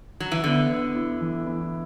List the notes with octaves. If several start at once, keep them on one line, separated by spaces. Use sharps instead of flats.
F#3
E3
D3 B3
B3
E4
E3
E4